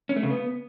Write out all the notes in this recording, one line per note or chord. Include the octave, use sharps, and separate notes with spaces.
C#4
A3
C#3
B3